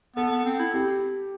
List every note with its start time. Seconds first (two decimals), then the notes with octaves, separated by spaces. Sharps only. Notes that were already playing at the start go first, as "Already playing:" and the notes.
0.16 B3 A4
0.31 B3
0.45 C4
0.60 E4
0.74 C4 G4